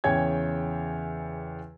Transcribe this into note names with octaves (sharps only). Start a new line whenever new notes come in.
E2 C#3 C#5 G5 G#5 G#6